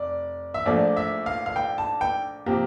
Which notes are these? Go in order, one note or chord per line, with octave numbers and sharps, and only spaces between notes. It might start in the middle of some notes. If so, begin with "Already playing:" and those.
Already playing: F1 D5
E5
A#1 A#2 F3 A3 D5
E5
F5
F5
G5
A5
G5
C3 F3 A#3 G4